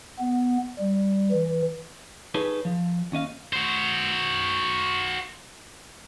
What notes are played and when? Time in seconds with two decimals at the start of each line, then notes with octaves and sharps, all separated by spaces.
0.19 B3
0.79 G3
1.31 E3
2.34 D#4 G#4 A4 B4 C#5
2.65 F3
3.12 D#2 C#4 D#5 F5
3.53 F#4 C5